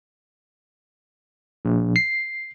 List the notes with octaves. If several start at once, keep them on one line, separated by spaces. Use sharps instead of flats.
A#1
C7